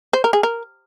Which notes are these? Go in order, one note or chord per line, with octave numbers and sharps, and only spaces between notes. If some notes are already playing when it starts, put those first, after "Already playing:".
C5
A#4
G#4
A#4